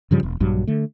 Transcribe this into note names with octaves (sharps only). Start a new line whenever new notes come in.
G2 C#3 F3 G3
E1
A#1 G2 F#3
D3 A3